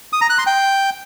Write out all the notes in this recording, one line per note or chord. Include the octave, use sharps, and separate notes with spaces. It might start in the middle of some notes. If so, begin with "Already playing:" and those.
D#6
A#5
F#6
C6
G5